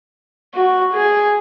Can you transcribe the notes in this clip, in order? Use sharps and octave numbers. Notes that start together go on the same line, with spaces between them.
F#4
G#4